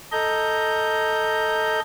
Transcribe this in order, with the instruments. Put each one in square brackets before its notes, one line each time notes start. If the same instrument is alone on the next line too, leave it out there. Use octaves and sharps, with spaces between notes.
[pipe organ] A4 D#5 A#5 G6